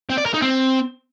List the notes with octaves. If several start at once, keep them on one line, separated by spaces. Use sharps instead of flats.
C4
D5
A#4
D#4
C4